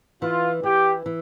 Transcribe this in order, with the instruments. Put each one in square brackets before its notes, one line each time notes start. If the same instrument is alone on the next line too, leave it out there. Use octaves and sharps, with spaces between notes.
[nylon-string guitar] E3 [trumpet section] F4
[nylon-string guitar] E3 [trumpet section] G4
[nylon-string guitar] E3